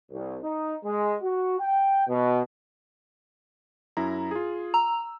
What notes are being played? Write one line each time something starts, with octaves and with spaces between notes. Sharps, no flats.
C2
D#4
G#3
F#4
G5
B2
F#2 E4 A#5
F4 G#4
A#5 E6